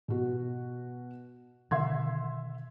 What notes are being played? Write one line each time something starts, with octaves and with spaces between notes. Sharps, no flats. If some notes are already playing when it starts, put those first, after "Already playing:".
B2 F#4
B2 D3 D#3 E5 C6 G#6